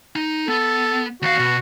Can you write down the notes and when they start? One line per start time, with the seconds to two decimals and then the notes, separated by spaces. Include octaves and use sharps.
0.16 D#4
0.48 B3 A4
1.22 D#2 F#4 F5
1.39 B2